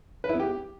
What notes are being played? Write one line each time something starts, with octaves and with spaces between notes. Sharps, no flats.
B4
E4
B3
G4